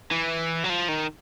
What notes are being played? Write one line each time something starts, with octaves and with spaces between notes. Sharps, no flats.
E3
F#3
F3
D#3